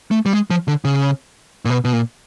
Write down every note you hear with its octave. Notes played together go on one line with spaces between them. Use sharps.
A3
G3
G#3
F3
D3
C#3
A#2
B2
B2
A#2